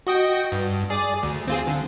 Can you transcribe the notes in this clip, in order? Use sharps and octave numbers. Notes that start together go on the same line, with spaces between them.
F#4 D#5 G5
G2
G#4 D5
D2
C4 F4 G#4
D3